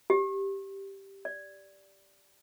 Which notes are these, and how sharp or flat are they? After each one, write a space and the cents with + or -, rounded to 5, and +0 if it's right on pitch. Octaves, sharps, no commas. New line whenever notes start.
G4 -5
D5 -10